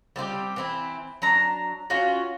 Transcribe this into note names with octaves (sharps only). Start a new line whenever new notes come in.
G3 C4 E4 G4
E3 C4 E4
F#3 D4 A#5
C#4 F4 F#4